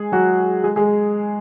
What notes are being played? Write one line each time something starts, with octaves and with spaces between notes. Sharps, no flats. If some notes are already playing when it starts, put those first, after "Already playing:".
Already playing: G#3 G#4
F#3 F#4
G#3 G#4
G#3 G#4